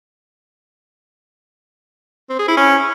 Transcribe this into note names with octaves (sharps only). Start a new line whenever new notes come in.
C4
G#4
E4
C#4